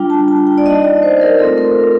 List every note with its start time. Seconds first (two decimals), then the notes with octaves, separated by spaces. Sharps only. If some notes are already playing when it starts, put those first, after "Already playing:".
Already playing: G3 D4 F4 G5
0.10 A5
0.28 A5
0.47 G5
0.58 D5
0.65 A#3 D#4 D#5
0.84 D5
1.03 C5
1.21 A#4
1.39 A3 C4 F4 A4
1.58 A#4